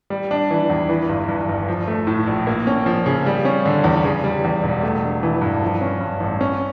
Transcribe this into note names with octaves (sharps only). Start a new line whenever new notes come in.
G3
D4
E3
E2
E3
G1
G2
G1
F3
A3
A2
A#1
A#3
C#4
F3
C#3
G3
C#4
D3
E2
C#3
G3
E2
E1
A3
D4
E3
G2
F3
C#4
G2
A1
C#4